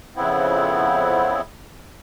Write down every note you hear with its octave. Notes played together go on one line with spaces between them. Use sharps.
F2 C#3 B3 C4 E4